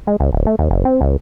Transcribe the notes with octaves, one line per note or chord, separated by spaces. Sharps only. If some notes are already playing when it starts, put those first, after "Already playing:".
G#3
C#2
D1
A3
D#2
F#1
C4
C#2